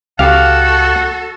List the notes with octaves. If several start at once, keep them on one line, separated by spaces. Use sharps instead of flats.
C#2 F#4 G4 A4 F5 F#5